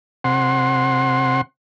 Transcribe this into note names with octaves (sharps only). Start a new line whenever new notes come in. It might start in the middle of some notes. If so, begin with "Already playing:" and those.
C3 F#5 C6